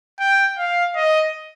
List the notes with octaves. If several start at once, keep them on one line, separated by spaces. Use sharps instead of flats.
G5
F5
D#5